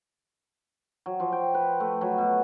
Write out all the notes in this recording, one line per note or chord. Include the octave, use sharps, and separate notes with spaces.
F#3
F3
G5
B4
A3
F#3
B2